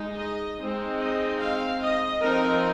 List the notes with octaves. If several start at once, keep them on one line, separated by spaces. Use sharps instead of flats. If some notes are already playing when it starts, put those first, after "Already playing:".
Already playing: G#3 D#4
D#5
G#3 C4 D#4
D#5
F5
D#5
F3 C4 D#4 A#4